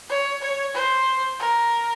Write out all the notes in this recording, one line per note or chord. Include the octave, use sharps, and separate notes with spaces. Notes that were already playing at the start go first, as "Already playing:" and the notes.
C#5
C#5
C5
A#4